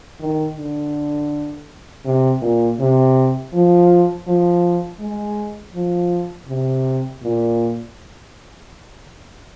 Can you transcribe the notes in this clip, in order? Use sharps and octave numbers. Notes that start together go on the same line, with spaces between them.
D#3
D3
C3
A#2
C3
F3
F3
G#3
F3
C3
A#2